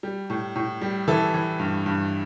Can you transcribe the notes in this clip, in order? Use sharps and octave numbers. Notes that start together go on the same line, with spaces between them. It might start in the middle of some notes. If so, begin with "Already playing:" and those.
G3
A2
A2
G3
E3 E4 A4
E3
G2
G2